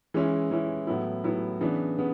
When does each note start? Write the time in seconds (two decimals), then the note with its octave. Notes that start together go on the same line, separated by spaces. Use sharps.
0.14 E3 G#3 C#4 E4
0.51 E3 G#3 C#4 E4
0.87 A2 F#3 B3 E4
1.24 A2 F#3 B3 E4
1.61 C#3 E3 B3 D4
1.98 C#3 B3